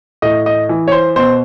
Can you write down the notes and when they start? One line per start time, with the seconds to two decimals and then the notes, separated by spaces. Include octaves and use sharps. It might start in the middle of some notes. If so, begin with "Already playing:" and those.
0.22 A2 D#5
0.46 D#5
0.69 E3
0.88 C#5
0.92 C5
1.16 B2 C5